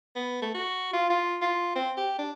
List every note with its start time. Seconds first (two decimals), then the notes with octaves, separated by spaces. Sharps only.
0.16 B3
0.42 A3
0.55 F#4
0.93 F4
1.10 F4
1.41 F4
1.76 C4
1.97 G4
2.19 D4